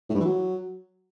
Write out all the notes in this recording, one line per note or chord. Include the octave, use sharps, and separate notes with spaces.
A2
G2
E3
F#3